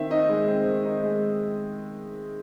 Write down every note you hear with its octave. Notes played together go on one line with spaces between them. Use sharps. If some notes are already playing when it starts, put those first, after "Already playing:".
Already playing: D#3 C4 E5
D#4 D#5
G#3
C4
D#3
D#4
G#3